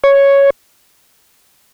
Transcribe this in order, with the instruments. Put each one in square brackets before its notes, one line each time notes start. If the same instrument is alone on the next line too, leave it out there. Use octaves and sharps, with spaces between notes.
[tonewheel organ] C#5